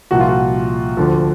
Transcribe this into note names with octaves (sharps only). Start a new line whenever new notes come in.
C2 A#2 F3 F#4
F4
F#4
D2 D3 F3